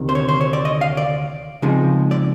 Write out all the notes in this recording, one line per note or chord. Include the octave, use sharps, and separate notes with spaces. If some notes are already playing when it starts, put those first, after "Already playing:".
Already playing: D2 C3 D#3
C5
C#5
C5
C#5
D5
D#5
F5
D5
C#3 F3 G#3 C4 D#4
D5